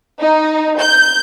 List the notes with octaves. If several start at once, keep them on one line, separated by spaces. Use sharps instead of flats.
D#4
G6